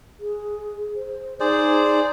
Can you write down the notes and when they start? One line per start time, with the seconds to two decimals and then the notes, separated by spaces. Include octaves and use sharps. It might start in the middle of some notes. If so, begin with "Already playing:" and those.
0.20 G#4
0.95 C5
1.40 D#4 G#4 C5 D5